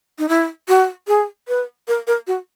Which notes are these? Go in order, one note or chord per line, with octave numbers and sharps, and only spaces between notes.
D#4
E4
F#4
G#4
B4
A#4
A#4
F#4